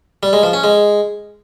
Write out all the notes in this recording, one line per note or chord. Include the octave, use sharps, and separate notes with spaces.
G3
G#3
F3
C#4
G#3